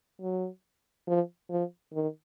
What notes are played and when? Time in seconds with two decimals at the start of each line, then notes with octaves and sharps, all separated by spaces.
0.22 F#3
1.07 F3
1.50 F3
1.94 D#3